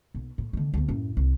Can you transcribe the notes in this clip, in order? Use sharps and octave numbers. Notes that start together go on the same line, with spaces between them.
B1
A2
D3 D#3
D2 B3
F#2 A2
C2